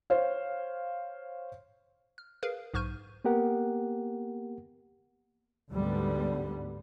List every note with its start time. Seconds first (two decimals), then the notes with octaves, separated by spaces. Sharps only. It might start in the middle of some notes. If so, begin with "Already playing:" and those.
0.10 C5 C#5 F5
2.18 F6
2.43 G#4 A#4 B4 F5
2.74 B1 G#2 C#6 F6 G6 D#7
3.25 A#3 B3 G4 A#4 F#5
5.71 D2 G#2 D3 G3 B3